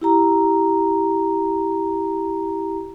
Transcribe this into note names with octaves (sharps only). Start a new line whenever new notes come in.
E4 G4 A#5